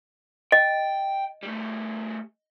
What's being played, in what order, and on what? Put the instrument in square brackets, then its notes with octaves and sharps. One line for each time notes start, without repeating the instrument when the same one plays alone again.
[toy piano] D#5 [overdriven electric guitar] G5
[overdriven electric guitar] G3 A3